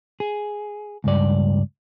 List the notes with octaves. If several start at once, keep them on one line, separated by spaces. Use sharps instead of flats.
G#4
C#2 G2 D5